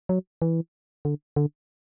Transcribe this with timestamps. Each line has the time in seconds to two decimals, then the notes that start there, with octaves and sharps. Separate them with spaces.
0.09 F#3
0.42 E3
1.05 D3
1.36 D3